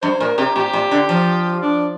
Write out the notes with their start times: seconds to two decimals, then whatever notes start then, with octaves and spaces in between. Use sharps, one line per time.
0.02 G2 C5
0.20 A#2 A#4
0.38 C3 G4
0.55 A#2 G4
0.73 A#2
0.91 D3
1.09 F3
1.62 D4